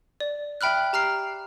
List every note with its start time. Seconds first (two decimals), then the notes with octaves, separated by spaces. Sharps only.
0.20 D5
0.61 E5 G5 B5 F6 F#6
0.93 G4 A#5 F6 C7